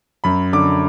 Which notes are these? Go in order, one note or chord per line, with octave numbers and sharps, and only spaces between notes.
F#2 B5
D3 D6